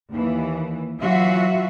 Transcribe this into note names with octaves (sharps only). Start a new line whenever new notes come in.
D#2 E3
E3 F#3 F4 F#4 E5